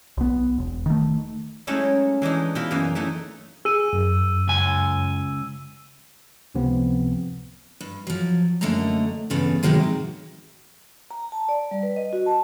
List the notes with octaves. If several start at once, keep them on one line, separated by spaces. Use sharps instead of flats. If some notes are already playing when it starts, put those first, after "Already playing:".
B1 B3
E1
D#3 A3
F#3 G#3 A3 C#4 D#4 E4
E3 G#3 D4 D#4
B2 E4 F4 B5
F#2 E3 A#3 D#4
E3 A3 D#4
G#4 E6 D#7
F#2
C#2 G#5
C#2 C3 F3 B3 C4
G2
F3 F#3
F#2 D3 A3 A#3 D#5 A#5
E2 G2 C#3 A3 B3
A2 C3 D#3 F#3 G#3 A#3
A#5
A5
D5
G3
B4
D#5
F#4
A5